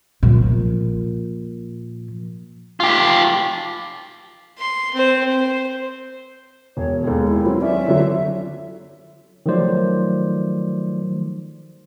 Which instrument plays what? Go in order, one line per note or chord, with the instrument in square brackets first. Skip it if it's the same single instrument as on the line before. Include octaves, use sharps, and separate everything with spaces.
[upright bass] A#2 F3
[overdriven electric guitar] F4 G4
[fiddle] C6
C4 C5
C5
[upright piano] E1 [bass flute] C#5
[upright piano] D#2 G#3 [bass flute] A4
[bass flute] E4
[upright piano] F#3 [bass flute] C4
[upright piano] C#4 D5 [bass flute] E5
[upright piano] D3 F#3
[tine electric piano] D#3 F3 F#3 A3 C5 D5